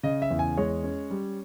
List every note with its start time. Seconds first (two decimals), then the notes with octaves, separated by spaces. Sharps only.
0.03 C#3 D#5
0.22 E5
0.30 E2
0.39 G#5
0.57 G#3 C#5
0.84 C#4
1.11 G3